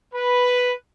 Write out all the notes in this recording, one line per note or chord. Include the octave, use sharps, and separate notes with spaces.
B4